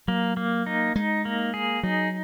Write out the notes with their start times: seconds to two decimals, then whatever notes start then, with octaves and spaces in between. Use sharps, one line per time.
0.08 F#3 A#3
0.37 A#3
0.66 D#4
0.96 G#3 D#4
1.25 A#3
1.54 G#4
1.83 F#3 D#4